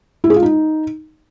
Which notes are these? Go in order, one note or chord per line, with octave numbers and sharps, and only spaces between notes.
E4
G#4
F4
D#4